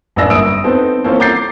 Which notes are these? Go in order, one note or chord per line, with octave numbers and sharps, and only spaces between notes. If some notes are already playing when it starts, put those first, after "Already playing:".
A1 F#2 A#3 D4 E6 A#6
G1 D#6 E6 D7
B3 C4 D#4 A4 C5
E3 A#3 C4 C#4 A4 C5
A#5 D6 G6 A6 C7